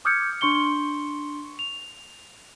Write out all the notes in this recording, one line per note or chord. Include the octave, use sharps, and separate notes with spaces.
D6 D#6 F6 G6 G#6 C#7
D4 C6 C#6 C#7 G7
F7